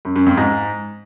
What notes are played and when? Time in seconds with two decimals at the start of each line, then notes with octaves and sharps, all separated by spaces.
0.05 F#2
0.16 F#2
0.26 F2
0.37 G#2